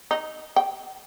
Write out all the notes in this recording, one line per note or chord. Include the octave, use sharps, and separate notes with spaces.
D#4
G5